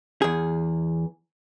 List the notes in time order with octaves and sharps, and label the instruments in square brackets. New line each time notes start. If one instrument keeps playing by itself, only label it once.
[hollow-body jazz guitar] E2 G#4